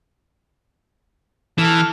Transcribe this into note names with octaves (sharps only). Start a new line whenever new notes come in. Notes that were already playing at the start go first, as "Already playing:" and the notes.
E3 A4 F6